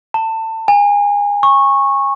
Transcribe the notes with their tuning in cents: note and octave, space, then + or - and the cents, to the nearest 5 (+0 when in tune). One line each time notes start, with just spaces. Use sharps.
A5 +25
G#5 -25
C#6 -15